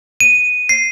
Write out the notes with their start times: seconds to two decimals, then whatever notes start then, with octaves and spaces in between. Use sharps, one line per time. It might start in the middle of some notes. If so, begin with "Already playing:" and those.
0.20 D#7
0.69 C7